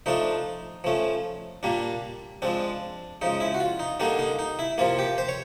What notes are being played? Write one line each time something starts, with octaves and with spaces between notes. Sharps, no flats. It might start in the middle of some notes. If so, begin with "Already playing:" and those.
F3 A3 D4 D#4
F3 A3 C#4
A#2 G3 A#3 D4
F3 G#3 C4 D4
C#3 F3 G#3 D#4
E4
F#4
F4
D#4
D3 G3 A#3 D4 D#4
D#4
D#4
E4
C3 F3 A#3 F4
G4
C5
C#5